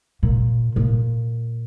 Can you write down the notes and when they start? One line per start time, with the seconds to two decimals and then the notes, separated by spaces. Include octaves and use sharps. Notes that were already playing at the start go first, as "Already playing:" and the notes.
0.23 A#2
0.76 A#2